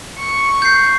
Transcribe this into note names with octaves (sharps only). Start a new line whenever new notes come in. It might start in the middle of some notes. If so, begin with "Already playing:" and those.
C#6
G6 C7